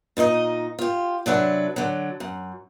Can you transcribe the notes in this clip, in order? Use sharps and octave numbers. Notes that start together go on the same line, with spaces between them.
A#2 D#4 C5 D#5
F4 G4
C3 F#3 D4 B4
D3 F#3
F#2